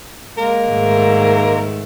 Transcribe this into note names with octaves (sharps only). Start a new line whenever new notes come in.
G#3 A#3 A#4
G#2 D#3 A3